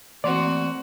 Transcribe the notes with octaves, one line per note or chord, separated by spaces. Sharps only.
E3 A3 A#3 C4 F#4 D5 C6